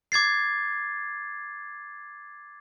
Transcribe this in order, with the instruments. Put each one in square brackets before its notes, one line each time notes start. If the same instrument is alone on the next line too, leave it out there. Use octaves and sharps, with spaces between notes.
[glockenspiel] D6 G#6 A6 C7